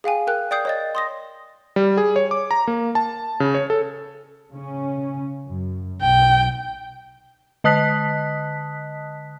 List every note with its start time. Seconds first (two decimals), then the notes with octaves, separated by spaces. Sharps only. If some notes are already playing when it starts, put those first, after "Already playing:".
0.04 G#4 F5 G5 G#5
0.27 A#4 G5 F#6
0.51 D5 G5 D#6 G6 C7
0.65 C#5 D#5 A6
0.95 C6 D#6 A#6
1.76 G3
1.98 G#4
2.16 C#5
2.31 D6
2.51 A#5
2.67 A#3
2.95 A5
3.40 C#3
3.54 C#5
3.70 A4
4.51 C#3 C#4
5.46 F#2
6.02 B1 G5
7.64 D3 D#5 A5 D#6 F#6 B6